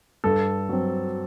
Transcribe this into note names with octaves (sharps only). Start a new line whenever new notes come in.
G2 A4
F#3 C4